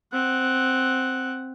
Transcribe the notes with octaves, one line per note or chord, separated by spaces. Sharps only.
C4 F#5